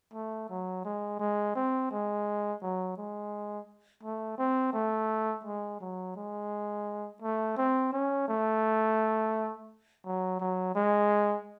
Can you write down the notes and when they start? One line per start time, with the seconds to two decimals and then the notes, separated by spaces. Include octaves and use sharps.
0.14 A3
0.49 F#3
0.85 G#3
1.20 G#3
1.55 C4
1.91 G#3
2.62 F#3
2.97 G#3
4.03 A3
4.38 C4
4.73 A3
5.45 G#3
5.80 F#3
6.16 G#3
7.22 A3
7.57 C4
7.93 C#4
8.28 A3
10.06 F#3
10.40 F#3
10.75 G#3